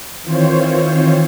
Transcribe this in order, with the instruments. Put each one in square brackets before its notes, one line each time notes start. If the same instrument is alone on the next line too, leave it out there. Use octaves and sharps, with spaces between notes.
[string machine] D#3 E3 C4 F4 C5 C#5